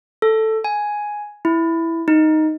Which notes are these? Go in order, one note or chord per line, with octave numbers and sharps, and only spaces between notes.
A4
G#5
E4
D#4